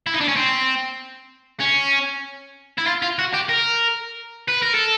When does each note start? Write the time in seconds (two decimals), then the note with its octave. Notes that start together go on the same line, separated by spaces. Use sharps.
0.06 E4
0.14 D#4
0.21 D4
0.28 C#4
0.36 C4
1.61 C#4
2.78 E4
2.86 F4
3.02 F4
3.19 F#4
3.34 G4
3.49 A#4
4.49 B4
4.62 A#4
4.75 A4